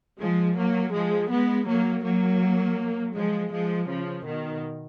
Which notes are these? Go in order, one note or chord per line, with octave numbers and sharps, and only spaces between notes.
F3 G#3
F#3 A#3
F3 G#3
G#3 B3
F#3 A#3
F#3 A#3
F3 G#3
F3 G#3
C#3 F3
B2 D#3